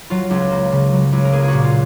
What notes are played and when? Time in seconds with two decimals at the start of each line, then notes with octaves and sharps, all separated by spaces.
0.10 F#3 F4
0.30 C#2
0.51 A#3
0.72 C#3
0.93 F#3
1.12 C#2
1.25 A#4
1.32 A#3 G#4
1.43 F#4 G#4
1.53 A#2
1.64 F4